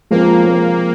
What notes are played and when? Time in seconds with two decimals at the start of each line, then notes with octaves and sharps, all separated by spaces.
0.11 F3 G#3 A#3 C4 F4 A#4
0.45 F3 G#3 C4 F4 A#4